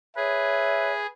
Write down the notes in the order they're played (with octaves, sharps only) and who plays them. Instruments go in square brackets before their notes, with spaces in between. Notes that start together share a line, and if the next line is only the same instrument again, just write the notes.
[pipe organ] G#4 [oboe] B4 [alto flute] C#5 [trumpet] E5